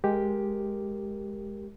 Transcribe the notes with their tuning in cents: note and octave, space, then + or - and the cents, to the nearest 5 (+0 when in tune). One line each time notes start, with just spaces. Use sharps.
G#3 +0 G4 +0 A#4 +0